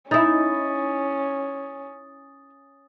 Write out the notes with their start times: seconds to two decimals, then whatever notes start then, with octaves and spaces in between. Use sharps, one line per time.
0.11 C#4 D#4 E4 G#5 D#6 A6